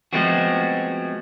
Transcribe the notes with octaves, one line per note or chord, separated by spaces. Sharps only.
F3 G#3 A3 B3 C4 F#4